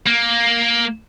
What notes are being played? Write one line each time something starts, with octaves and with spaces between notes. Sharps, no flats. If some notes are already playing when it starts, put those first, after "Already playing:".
A#3